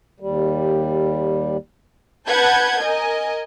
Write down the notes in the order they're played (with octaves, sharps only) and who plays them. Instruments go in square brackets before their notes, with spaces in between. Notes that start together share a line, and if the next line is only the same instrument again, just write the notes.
[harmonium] D#2 G3
[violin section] B4 F#5 A5 G6 G#6
A#4 D#5 G#5